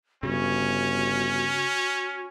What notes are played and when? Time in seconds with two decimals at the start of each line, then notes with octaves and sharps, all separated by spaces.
0.23 G1 C#3 C#4 F#4